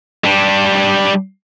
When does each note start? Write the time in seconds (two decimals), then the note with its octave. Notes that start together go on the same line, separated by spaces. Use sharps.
0.24 G3 D4